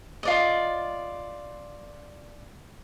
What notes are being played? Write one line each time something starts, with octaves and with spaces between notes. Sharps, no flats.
F4 D5 D#5